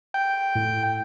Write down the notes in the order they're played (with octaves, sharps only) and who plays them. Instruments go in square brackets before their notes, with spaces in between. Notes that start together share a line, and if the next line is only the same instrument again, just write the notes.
[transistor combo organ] G5
[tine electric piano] A2